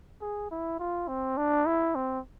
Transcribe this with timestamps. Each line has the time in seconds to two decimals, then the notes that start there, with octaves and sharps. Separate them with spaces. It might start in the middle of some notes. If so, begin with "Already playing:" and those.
0.21 G#4
0.51 E4
0.80 F4
1.08 C4
1.38 D4
1.66 E4
1.95 C4